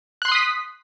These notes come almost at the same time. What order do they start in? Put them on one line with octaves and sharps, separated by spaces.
F#6 C6 C7 D#6 B6